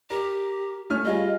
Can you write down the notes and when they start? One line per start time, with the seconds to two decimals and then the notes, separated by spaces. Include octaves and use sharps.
0.10 G4 A#4
0.90 A3 C#4 F6
1.05 G3 F4 G#4 D#5